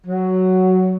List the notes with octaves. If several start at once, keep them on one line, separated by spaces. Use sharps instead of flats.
F#3